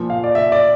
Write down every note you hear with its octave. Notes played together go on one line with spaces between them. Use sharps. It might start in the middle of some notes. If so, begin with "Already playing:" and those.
Already playing: A#2 F3
F5
D5
E5
D5